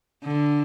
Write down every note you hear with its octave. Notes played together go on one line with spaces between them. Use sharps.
D3